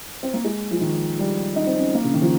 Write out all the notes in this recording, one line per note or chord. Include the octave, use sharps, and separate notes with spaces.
C4
A#3
G#3
F3
D#3
G3
D#4
C4
C#4
A#3
C#3
D#3
F3